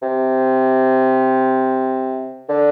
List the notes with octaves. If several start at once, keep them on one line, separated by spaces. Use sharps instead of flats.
C3
D3